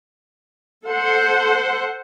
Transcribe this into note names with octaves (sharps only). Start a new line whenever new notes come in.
A4 C5 F#5